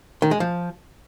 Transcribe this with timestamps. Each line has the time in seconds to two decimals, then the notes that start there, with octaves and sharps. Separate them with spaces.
0.22 D#3
0.31 G#3
0.40 F3